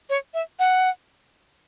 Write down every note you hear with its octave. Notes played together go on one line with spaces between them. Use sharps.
C#5
E5
F#5